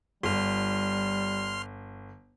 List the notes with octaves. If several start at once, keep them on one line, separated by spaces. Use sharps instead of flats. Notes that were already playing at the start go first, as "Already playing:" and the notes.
G1 G3 C6 F6